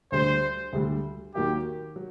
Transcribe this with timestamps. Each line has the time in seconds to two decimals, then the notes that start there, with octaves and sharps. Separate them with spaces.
0.12 D2 D3 G3 C5
0.73 D2 D3 G3
1.35 D#2 D#3 F#3 A#3 F#4 G4
1.96 F#3